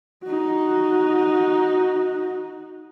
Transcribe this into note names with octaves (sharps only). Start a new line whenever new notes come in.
D#4 F#4